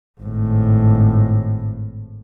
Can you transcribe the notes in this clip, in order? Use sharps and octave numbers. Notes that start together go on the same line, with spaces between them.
G#1 A2